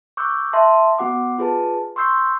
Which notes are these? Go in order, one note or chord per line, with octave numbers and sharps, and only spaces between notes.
C#6 D6 E6 F#6 G6
E5 A5 C6
B3 F#4 F#5 D6
F4 G#4 B4 A5
C6 C#6 E6 G6 C7